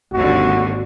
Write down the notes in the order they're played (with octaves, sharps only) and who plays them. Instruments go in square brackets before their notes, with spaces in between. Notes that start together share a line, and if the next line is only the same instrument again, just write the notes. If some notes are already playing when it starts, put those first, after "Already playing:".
[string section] G#1 D#2 D3 [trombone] F#4